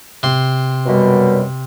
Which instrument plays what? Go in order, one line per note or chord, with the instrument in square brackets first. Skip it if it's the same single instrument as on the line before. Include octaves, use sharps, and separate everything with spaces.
[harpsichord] C3 C6
[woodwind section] F#2 B2 G3